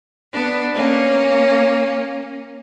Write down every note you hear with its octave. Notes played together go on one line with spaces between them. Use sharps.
B3 D4
A#3 C#4